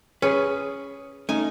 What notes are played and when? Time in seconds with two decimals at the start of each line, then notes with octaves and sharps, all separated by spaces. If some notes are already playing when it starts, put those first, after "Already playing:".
0.22 C#4 G#4 B4
1.29 A3 C#4 D#4 G#5